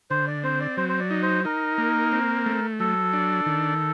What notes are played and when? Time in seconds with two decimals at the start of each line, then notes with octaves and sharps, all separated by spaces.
0.10 D3 C5
0.27 D5
0.43 C4 C5
0.61 D5
0.77 F#3 C5
0.89 C5
1.00 D5
1.10 D#4
1.22 C5
1.45 D#4 A#4
1.78 A#3
2.12 C4
2.46 A3
2.80 F#3 A4
3.13 D4
3.46 D#3